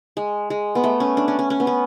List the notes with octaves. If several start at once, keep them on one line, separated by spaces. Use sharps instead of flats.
G#3
G#3
B3
A3
C#4
D4
C#4
C#4
C#4
B3
C#4